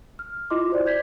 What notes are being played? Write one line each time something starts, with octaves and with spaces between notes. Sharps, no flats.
F6
E4 F4 D#5 C6 D6
F#4 C5 D5
G6 G#6 B6